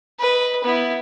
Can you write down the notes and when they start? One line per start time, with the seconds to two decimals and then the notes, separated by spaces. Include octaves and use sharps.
0.19 B4 D#5
0.64 B3 E4